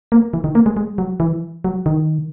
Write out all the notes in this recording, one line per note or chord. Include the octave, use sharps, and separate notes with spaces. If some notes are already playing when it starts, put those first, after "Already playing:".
A#3
E3
D#3
A#3
G#3
G#3
F#3
E3
F#3
D#3